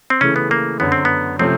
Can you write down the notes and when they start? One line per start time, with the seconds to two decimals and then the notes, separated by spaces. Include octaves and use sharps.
0.10 C4
0.21 C#3 E3 A3 C#4
0.36 B3
0.51 A#3
0.80 F#2 D3 F#3 B3
0.92 C4
1.05 B3
1.39 C3 F3 A3 C4 C#4 F4